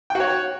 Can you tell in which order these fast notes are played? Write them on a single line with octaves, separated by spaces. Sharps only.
G5 F#4 C#5